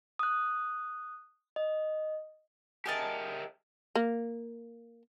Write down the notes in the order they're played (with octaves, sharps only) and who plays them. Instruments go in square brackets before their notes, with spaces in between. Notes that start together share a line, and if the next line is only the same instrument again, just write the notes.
[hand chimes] D#6 F#6
D#5
[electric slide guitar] G4 A#4 E5 [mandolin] G#4 D#5 A5
[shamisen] A#3